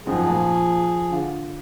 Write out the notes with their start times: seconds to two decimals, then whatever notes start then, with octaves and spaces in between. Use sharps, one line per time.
0.06 G#1 F#2 F3 G#4
0.28 A#1 A#3 A5
1.11 D3 F4